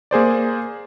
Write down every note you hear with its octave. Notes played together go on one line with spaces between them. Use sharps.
A#3 G#4 C5 D5